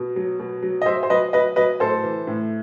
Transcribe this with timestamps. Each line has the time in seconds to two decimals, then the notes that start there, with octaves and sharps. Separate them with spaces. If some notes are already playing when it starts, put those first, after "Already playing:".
Already playing: B2
0.16 F#3
0.39 B2
0.62 F#3
0.82 D#5
0.86 F#3 C5 E5
1.03 C5
1.10 F#3 B4 D#5
1.33 F#3 B4 D#5
1.56 F#3 B4 D#5
1.80 A2 A4 C5
2.04 E3
2.27 A2